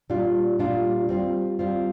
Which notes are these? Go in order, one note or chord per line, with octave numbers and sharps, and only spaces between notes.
A#2 G3 D4 F4
A#2 G3 D4 F4
G3 C4 F4
G3 C4 F4